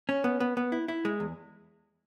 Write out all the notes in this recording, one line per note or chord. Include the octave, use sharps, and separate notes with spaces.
C#4
B3
B3
B3
E4
E4
G#3
E2